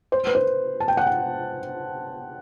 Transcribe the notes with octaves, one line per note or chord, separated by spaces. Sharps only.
C5
B4
C5
A5
G5
F#5
G5